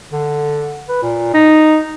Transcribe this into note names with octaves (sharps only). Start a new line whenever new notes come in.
D3
B4
A#2
D#4